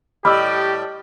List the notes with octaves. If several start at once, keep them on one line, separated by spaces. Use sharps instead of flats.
A2 G3 G4 D#5 B5 D6 E6 F6